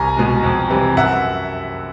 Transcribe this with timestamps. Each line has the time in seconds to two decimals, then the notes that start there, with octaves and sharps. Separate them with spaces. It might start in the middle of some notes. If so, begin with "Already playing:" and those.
Already playing: C2 G#5 A#5
0.17 B2 G#3
0.43 F2
0.70 C3 E3 G3
0.96 F#2 E5 F#5